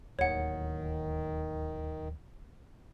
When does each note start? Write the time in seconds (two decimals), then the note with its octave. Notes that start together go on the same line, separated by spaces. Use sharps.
0.19 D1 D#2 D#3 C#5 F#5